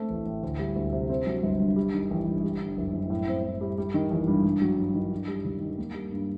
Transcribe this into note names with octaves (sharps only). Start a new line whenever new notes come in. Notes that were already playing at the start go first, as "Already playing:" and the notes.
Already playing: A3 C4
A1
A2
D2
G3
D2
C3
C4
F#3
G1
G2
G3
D#3
A1
G2
G3
D3
F#1
F#2
A2
C4
A2
G3
G3
D#3
A1
G2
G2
F#3
G2
D#3
D4
G3
D#2
D#3
A#3
G3
G2